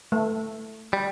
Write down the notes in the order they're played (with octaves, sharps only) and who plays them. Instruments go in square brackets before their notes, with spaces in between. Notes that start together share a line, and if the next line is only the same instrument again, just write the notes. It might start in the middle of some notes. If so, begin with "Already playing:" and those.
[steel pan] A3
[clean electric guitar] G3